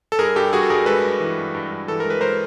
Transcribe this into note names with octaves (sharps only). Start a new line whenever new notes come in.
A4
G2 G#4 A#4
G2 G4 A4
G2 F#4 G#4
A4
G2 G#4 A#4
G#3 A4 B4
G2
E3
G2
G2
G2
E3 A4
A#4
G#3
B4
G#3 A#4 C5